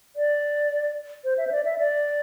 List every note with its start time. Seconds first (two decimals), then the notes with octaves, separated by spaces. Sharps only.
0.16 D5
1.24 C5
1.38 E5
1.47 C5
1.52 D5
1.65 E5
1.79 D5